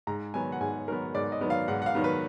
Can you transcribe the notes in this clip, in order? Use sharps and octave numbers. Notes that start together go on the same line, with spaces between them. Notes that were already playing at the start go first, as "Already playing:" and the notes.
G#2 A#5
D#3 F#3 B3 G#5
F#5
G#2 G#5
D#3 F#3 B3 A#4
G#2 D5
D#5
D#3 F#3 B3
F5
G#2 F#5
F#5
F5
D#3 F#3 B3
B4